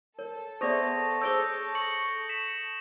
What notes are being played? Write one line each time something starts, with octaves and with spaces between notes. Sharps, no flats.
A4 A#4 C#5
B3 G#4 C5 D5 E5 C#6 D#6 A#6
G#4 C5 C#5 E6 G6 D7 G7
C#6 A#6 C#7 F#7
B6 C#7 E7